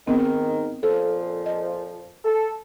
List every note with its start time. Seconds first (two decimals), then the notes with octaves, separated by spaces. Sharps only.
0.07 G#2 D#3 B3 C4
0.83 F2 A#2 F3 A4
1.46 D#5
2.25 A4